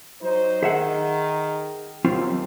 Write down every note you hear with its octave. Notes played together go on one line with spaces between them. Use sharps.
F#3 D#4 C5
D#3 G#4 E5 F#5
D#2 F#3 C4 F4